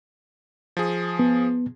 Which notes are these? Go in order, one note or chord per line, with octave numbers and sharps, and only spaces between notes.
F3 G#4
B3